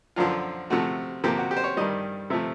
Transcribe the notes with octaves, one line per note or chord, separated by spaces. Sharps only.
F#2 D3 F3 F4
C3 F3 A3 F#4
C3 F3 A#3 G4
F#4
G4
C5
C#5
G2 D#3 G3 D#5
C3 F3 A3 E5